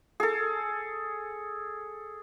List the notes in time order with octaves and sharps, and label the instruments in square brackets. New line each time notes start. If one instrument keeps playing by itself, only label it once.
[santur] G#4 A4